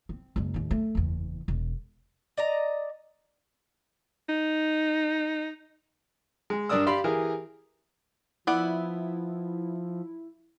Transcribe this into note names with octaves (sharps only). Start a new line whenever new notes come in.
C4
F#1 G#3
D#2 A2
A3
F#1 E2
E1
D5 D#5 A#5
D#4
G#3
G2 D4 A#4 D5 D#6 E6
G4 D5 F5 B5 C6
E3 G4 G#4 A#4
F3 B3 E4 D5 F#5